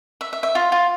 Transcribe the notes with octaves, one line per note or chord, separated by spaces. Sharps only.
E5
E5
E5
F4
F4